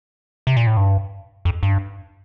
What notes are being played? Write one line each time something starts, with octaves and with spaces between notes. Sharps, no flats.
C3
A#2
A2
G2
F2
G2